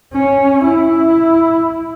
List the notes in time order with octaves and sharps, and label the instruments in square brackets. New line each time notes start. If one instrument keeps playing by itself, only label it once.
[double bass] C#4
E4